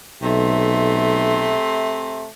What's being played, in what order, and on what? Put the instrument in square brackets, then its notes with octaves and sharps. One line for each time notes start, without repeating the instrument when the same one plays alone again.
[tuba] B1 [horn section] C3 A3 C6